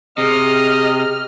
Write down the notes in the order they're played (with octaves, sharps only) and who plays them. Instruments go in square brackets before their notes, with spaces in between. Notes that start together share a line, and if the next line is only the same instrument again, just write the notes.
[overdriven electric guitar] C3 [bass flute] G#4 [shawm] D#5 [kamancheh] F6